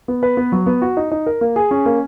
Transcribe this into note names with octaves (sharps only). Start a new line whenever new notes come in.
B3
B4
B3
F#3
B3
F#4
D#4
D#4
A#4
A#3
G#4
C#4
A#3